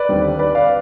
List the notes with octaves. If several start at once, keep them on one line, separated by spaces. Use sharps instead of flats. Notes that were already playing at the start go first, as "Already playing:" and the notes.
Already playing: B4 D5
D#2 D3 G3 C4
B4 D5
D5 F5